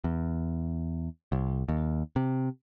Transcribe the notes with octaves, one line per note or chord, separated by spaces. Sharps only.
E2
C2
D#2
C3